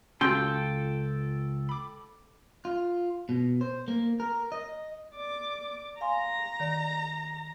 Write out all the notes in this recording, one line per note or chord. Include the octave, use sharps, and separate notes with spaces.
C#2 C#4 F4 F#4 A4 G5 C6
B5 D6
F4
B2
C5
A#3
A#4
D#5
D5 D6
F5 G#5 A#5 C6
D#3 D5